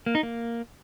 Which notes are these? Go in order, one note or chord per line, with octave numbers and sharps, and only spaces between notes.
A#3
D#4
A#3